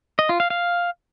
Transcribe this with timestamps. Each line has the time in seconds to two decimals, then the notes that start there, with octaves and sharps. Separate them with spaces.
0.19 D#5
0.29 F4
0.40 F5
0.50 F5